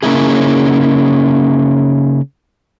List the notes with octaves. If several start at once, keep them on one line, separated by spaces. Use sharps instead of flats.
C#3 A#3 C#4 D#4 E4 G#4